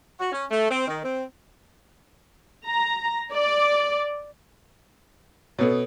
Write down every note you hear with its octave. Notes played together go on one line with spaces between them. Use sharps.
F#4
C#4
A3
C4
D#3
C4
A#5
D5
B2 B3 A4 C#5